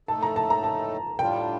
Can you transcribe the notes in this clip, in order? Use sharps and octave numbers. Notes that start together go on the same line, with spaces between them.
A2 A3 D#4 A4 A5
A#5
A5
A#5
A5
A2 G3 D4 F4 G5